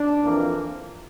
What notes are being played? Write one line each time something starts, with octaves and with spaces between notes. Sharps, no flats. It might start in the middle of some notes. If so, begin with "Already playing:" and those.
Already playing: D4
F2 E3 A#3